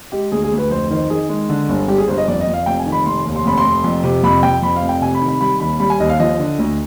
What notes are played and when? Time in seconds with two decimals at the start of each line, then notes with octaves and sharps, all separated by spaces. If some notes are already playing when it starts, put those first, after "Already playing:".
0.12 G#3 G4
0.32 D2 G#4
0.44 G#4
0.52 D2
0.58 B4
0.71 F2 C5
0.90 D#3 C5
1.10 D#3 G#4
1.29 G#3
1.49 D3
1.69 G1
1.88 G3 G4
1.98 G#4
2.08 G1 C5
2.18 D#5
2.28 F2 D5
2.40 D#5
2.47 F2
2.53 F5
2.66 F1 G5
2.79 G#5
2.86 D#3
2.92 B5
3.06 F1 C6
3.25 D#2
3.36 C6
3.45 F1 B5
3.58 C6
3.64 F1
3.84 F2
4.04 C3
4.23 F2 B5
4.43 F2 G5
4.62 F2 B5
4.76 F5
4.82 F1
4.89 G5
5.01 C3 G#5
5.15 B5
5.21 D#3
5.28 B5
5.41 G3 B5
5.60 D#2 B5
5.80 G3 B5
5.90 G#5
6.00 D#2 D#5
6.10 F5
6.19 F3 D#5
6.39 D3
6.58 D2